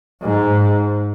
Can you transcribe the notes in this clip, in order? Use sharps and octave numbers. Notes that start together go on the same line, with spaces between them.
G#2